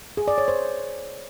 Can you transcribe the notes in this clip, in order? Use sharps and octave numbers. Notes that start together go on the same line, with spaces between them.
G#4
D5
C#5
C5